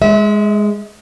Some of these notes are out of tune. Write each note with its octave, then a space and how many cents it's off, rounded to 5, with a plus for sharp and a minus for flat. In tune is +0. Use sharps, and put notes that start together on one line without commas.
G#3 +0 E5 -35